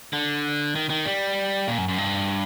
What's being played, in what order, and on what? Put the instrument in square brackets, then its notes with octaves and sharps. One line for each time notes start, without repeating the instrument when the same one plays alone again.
[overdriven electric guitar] D3
D#3
D#3
G3
A#2
F#2
F#2
G2